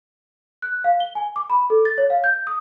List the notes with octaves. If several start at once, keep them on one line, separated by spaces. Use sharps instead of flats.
F#6
F5
G7
G#5
D6
B5
A4
A6
C#5
F5
G6
D#6